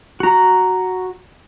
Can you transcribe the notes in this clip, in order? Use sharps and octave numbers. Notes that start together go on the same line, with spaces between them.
F#4 A#5